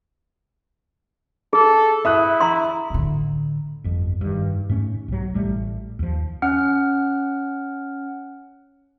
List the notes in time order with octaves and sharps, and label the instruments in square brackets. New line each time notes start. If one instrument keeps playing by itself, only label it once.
[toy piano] G#4 [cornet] A4
[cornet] E4 [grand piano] E5 D#6 F#6
[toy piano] A#5 C6
[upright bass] A2 D3
[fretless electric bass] G1 F2
G2 D#3
G#2 A3 C#4
B1 F#3
A1 G3 A3
D#2 F3
[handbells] C#4 F#5 F6